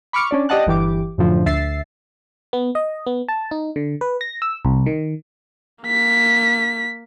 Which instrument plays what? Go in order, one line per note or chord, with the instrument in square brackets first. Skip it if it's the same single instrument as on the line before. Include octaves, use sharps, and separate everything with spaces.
[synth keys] B5 C#6 D6 F6 C#7
C#4 D4 D5
G4 D5 D#5 F#5 A5 F#6
G1 E3 G4 D6
F#2 A2 D3 F3
D2 E5 A6 C7
[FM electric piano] B3
D#5
B3
A5
D#4
D3
B4
A#6
E6
C2
D#3
[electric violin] A#3 B6